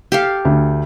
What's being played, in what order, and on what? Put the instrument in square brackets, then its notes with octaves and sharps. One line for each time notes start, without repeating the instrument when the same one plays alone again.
[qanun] G4 A4 F5
[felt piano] D2